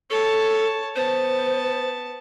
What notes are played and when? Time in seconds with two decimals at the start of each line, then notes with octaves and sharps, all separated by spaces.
0.10 A4 C#5 A5
0.96 B3 C5 A5